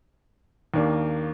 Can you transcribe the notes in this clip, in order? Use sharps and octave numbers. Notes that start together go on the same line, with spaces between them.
D#2 D#3 A#3 D4